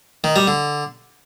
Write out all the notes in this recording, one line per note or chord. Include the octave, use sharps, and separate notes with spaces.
D#3
G3
D3